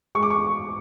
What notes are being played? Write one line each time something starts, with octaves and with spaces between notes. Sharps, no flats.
G#3 C#6
D6
C#6